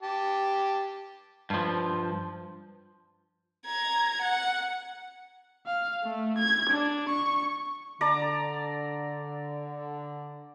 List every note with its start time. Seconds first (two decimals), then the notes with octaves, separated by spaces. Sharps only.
0.03 G4 A5
1.50 G2 F3
3.65 A#5 G#6
4.22 F#5
5.66 F5
6.04 A3
6.39 G#6
6.70 D4
7.10 C#6
8.01 D3 D5 A5 A#5